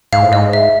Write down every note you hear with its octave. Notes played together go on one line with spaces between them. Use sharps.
G#2 F5
A2
G#2 D#5
E5